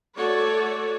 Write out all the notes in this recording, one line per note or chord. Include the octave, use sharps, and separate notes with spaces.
A3 F#4 A4 C#5 D5